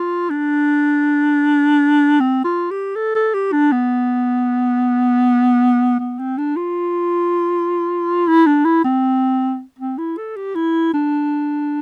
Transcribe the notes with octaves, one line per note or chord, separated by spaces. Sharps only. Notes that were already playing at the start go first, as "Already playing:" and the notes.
Already playing: F4
D4
C4
F4
G4
A4
A4
G4
D4
B3
B3
C4
D4
F4
E4
D4
E4
C4
C4
E4
A4
G4
E4
D4